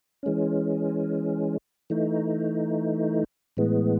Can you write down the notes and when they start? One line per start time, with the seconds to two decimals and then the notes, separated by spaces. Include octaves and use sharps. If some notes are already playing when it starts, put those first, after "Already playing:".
0.23 E3 G#3 C#4
1.90 E3 A3 D#4
3.57 A2 E3 G#3 B3